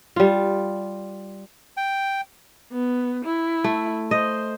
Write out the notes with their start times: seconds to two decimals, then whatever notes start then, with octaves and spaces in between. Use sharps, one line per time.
0.16 G3 F4
1.77 G5
2.72 B3
3.25 E4
3.64 A3
4.11 C5 D#5